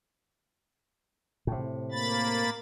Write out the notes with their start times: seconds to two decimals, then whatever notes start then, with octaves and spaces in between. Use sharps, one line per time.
1.47 A2 C3
1.92 A#3 B5 A6